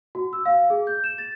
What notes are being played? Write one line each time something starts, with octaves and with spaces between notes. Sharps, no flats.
F#4
E6
F5
G#4
G6
E7
A6